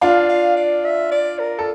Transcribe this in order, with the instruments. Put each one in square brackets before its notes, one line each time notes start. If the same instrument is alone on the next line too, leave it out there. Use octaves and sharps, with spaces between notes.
[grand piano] D4 F4 [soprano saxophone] F5
[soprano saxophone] F5
D5
E5
D5
A#4
[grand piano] A4